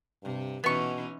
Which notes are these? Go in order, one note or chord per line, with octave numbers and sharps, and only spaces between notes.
G2 C3
B2 E3 B3 C#4 D#4 C#6